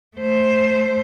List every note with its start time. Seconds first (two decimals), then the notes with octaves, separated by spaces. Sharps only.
0.17 A3 C5